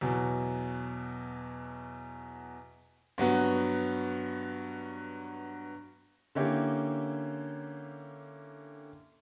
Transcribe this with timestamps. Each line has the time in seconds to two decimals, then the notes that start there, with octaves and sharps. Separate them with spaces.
0.01 E2 B2 F#3
3.18 G2 F#3 B3 F#4
6.35 D3 A#3 C#4 E4 G4